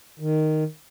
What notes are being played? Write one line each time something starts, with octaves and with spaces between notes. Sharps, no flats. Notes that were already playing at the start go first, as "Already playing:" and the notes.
D#3